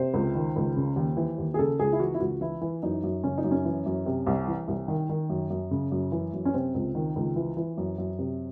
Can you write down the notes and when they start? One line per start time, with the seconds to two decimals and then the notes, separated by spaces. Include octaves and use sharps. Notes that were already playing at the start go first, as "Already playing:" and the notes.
Already playing: C3 C5
0.14 C#2
0.35 D#3
0.56 C#2
0.77 C#3
0.96 D#2
1.17 E3
1.38 D#2
1.54 G#4
1.59 C#3 A4
1.79 C#2 G#4
1.93 E4
2.00 E3 F#4
2.14 E4
2.20 C#2 F#4
2.41 E3 E4
2.61 E3
2.83 F#2 D#4
3.03 F#2
3.24 C#3 C#4
3.38 D#4
3.44 F#2
3.51 C#4
3.65 E3
3.86 F#2
4.06 C3
4.27 C2
4.48 E3
4.68 C2
4.88 D#3
5.09 D#3
5.29 F#2
5.50 F#2
5.71 C#3
5.91 F#2
6.12 E3
6.33 F#2
6.45 C#4
6.54 C3 C4
6.74 C#2
6.95 D#3
7.16 C#2
7.36 E3
7.57 E3
7.77 F#2
7.98 F#2
8.19 C3